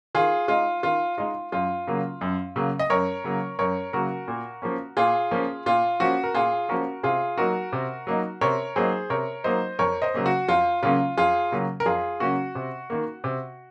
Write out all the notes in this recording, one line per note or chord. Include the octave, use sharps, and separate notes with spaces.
D#3 F4 G#4
G#3 D#4 F4
D#3 F4
G#3 D#4 F4
F#2 F4
C#3 F#3 A#3
F#2
C#3 F#3 A#3
D#5
F#2 A#4 C#5
C#3 F#3 A#3
F#2 A#4 C#5
C#3 F#3 A#3 F#4 A#4
A#2
F3 A#3 C#4
A#2 F4 G#4
F3 A#3 C#4
A#2 F4
F3 A#3 C#4 F#4
A#4
A#2 F4 G#4
F3 A#3 C#4 F#4 A#4
C3 F4 G#4
F#3 A#3 D#4 F#4 A#4
C3
F#3 A#3 D#4
C3 A#4 C#5
F#3 A#3 D#4 G#4 C5
C3 A#4 C#5
F#3 A#3 D#4 C5 D#5
F2 A#4 C#5
C5 D#5
C#3 F#3 A#3 C#4
F#4
F2 F4
C#3 F#3 A#3 C#4 F4
F2 F4 G#4
C#3 F#3 A#3 C#4
A#4
F2 F4 G#4
C#3 F#3 A#3 C#4 F#4
C3
D#3 A#3
C3